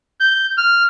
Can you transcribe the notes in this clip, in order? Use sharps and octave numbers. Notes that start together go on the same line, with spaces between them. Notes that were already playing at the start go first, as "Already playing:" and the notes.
G6
F6